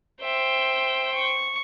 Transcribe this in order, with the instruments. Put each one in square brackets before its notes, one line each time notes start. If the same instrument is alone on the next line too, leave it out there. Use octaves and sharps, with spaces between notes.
[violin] C5 G5 [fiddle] E5
[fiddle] C#6